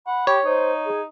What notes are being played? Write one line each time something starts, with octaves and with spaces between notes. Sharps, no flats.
F#5 B5
G4 C#5
D#4 C5
G#4